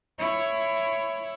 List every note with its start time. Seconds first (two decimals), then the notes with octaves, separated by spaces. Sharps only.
0.19 E4 C#5